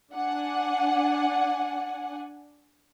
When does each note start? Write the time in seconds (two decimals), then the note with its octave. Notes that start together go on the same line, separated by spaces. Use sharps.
0.13 D4 F#5 G#5